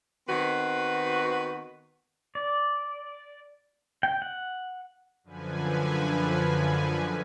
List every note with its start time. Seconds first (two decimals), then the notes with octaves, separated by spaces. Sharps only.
0.29 D#3 B3 C4 F#4 B4
2.35 D5
4.03 G5
4.22 F#5
5.24 F#2 D3 F3 B4 G#5